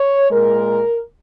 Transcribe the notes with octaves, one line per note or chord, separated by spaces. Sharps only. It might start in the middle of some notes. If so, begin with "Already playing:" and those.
Already playing: C#5
A#2 G#3 A#4